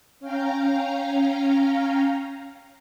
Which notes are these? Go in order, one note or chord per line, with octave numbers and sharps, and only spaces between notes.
C#4 F5 G5 A#5